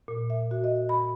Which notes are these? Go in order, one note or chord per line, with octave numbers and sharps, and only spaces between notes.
A#2
E5
F#4
D#5
B5